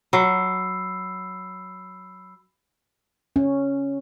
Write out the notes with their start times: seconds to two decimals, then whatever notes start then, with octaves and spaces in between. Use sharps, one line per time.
0.13 F#3 B5 E6 C7
3.36 C#4